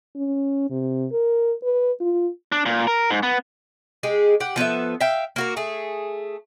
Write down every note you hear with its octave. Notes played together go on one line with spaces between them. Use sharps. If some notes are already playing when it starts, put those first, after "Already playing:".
C#4
C3
A#4
B4
F4
D4
A#2
A#4
G#2
B3
G#3 G4 G#4
G4 F#5
F3 B3 A4 E5
E5 F5 G5
A#3 F#4 A#4
A3 G#4